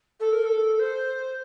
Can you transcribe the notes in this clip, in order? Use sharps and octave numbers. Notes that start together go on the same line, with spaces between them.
A4
A#4
A4
C5